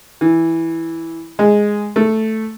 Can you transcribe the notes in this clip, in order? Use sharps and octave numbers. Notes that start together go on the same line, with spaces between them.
E3
G#3
A3